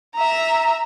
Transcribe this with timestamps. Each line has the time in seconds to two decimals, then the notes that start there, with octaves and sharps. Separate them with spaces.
0.15 E5 A#5